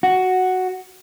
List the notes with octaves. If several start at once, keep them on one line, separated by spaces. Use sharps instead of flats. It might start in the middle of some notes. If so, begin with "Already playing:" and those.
F#4